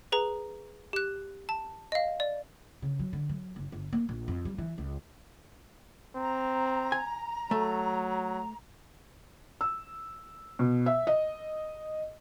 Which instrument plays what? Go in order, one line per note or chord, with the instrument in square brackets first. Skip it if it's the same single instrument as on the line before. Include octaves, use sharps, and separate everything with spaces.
[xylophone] G#4 B4 A#5
G4 F#6
A5
D#5 F5
D5
[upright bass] C#3
F#3
D3
F#3
F#1
G1
A#3
A#1
F2
G3
E3
C#2
[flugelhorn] C4 [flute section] A#5
[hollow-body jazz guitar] G#5
[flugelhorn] F#3 [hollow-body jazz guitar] A3
[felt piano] E6
B2
E5
D#5